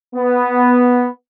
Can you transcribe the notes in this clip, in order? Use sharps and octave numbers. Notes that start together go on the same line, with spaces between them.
B3